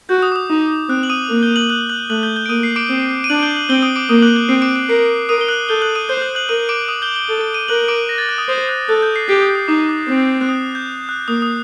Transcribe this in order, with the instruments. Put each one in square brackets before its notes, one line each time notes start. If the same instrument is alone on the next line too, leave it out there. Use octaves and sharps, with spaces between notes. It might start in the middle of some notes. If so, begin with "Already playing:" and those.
[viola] F#4 [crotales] G6
[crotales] D#6
D6
D#6
[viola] D#4
[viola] C4 [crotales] F#6
[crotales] F#7
D#6 D#7
[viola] A#3
[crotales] G6 G7
F#6 F#7
F#6 F#7
F#6 F#7
[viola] A3 [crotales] F#6 F#7
[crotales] G6 G7
G6 G7
D7
[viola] A#3 [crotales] D#6 D#7
[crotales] C7
D6 D7
[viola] C4
[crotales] D#7
[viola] D4 [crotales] F#6 F#7
[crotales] G6 G7
F#6 F#7
[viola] C4 [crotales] G6 G7
[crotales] D#6 D#7
D6 D7
[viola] A#3 [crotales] D#6 D#7
[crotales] F#6 F#7
G6 G7
[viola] C4 [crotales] C7
[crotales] D6 D7
D6 D7
[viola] A#4 [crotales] C7
[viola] A#4 [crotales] D#6 D#7
[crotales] G7
F#6 F#7
[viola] A4 [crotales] G6 G7
[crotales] F#6 F#7
D#6 D#7
[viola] C5 [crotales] G6 G7
[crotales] F#6 F#7
F#6 F#7
[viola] A#4 [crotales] D#6 D#7
[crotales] D6 D7
D#6 D#7
G6 G7
G6 G7
[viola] A4
[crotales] D7
D#7
[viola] A#4 [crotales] F#6 F#7
[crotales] D6 D7
A#6
A6
F#6
D#6
[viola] C5 [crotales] D#6
[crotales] F#6
[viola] A4 [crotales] F#6
[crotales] G6
C7
[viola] G4 [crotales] C7
[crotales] D#6
D#6
[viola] D#4 [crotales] D6
[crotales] D6
[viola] C4
[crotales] F#6
D#6
G6
F#6
[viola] A#3 [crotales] D#6
[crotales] D#6